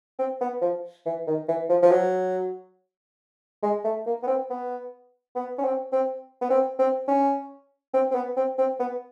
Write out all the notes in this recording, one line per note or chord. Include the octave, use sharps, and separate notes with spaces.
C4
B3
F3
E3
D#3
E3
F3
F3
F#3
G#3
A3
A#3
B3
C4
B3
B3
C#4
C4
C4
B3
C4
C4
C#4
C4
C4
B3
C4
C4
B3